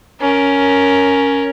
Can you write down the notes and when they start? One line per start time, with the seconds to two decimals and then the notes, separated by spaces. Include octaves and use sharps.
0.21 C#4 A#4